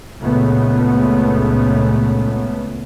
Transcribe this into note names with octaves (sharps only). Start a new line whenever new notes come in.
C#2 A#2 C#3 A3 B3